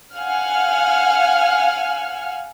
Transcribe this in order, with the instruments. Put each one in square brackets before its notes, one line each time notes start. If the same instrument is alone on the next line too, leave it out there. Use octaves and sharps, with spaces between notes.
[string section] F5 F#5 G#5 F6